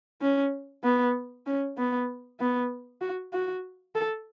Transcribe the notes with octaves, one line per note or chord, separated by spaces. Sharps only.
C#4
B3
C#4
B3
B3
F#4
F#4
A4